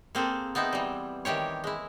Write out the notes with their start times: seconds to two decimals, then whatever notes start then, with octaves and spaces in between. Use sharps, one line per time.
0.15 A#3 C4 G#4 A4
0.55 B3 C4 D#4 E4 E5
0.73 E3 G3
1.25 D#3 E3 G4 C#5
1.64 G#3 E4